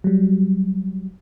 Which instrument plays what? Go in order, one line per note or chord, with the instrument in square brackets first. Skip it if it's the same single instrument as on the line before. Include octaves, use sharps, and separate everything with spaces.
[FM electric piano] F#3 G3